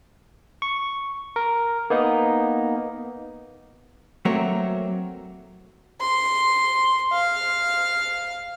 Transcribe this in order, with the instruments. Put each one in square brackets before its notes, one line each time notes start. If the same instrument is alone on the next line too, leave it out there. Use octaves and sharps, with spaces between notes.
[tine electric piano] C#6
A#4
A#3 B3 D#4
[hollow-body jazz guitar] F#3 A3 A#3 C4 A#4 C#5
[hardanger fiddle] C6
F5